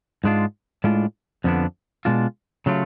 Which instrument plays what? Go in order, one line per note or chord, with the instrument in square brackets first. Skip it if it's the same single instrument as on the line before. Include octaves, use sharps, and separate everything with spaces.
[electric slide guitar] G#2 G#3 D4 F4
A2 G#3 D4 F4
F2 D3 F3 B3 D4
B2 G#3 D4 F4
C#3 F#3 A3 F4